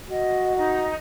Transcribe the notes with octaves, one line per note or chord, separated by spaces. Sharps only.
F#4 D#5
D#4